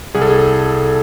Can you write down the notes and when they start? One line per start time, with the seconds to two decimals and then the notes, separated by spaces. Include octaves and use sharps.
0.15 C2 G#4
0.22 A4
0.30 G#4